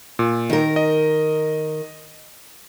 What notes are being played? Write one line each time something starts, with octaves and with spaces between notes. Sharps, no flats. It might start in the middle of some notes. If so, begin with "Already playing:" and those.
A#2
D#3 A#4
D#5